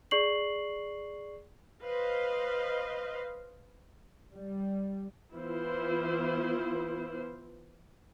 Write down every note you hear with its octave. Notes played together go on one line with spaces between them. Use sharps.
G#4 D5 C#6 C7 F#7
B4 C5 D#5 F5
G3
E3 B3 E4 F4 C5